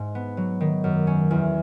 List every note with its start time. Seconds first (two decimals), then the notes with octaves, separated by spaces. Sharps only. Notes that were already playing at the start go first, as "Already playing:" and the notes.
Already playing: G#2
0.15 B3
0.37 F#3
0.61 D#3
0.84 F#2
1.07 C#4
1.31 E2